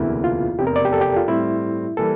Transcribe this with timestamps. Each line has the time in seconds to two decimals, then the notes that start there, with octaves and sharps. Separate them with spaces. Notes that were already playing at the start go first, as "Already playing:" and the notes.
Already playing: E1 D2 C3 E3 A#3 E4
0.24 F4
0.59 F1 E2 C3 G4
0.67 A#4
0.76 D5
0.85 G4
0.93 A4
1.01 G4
1.16 F4
1.28 A2 G3 C4 E4
1.97 E3 G3 A#3 A4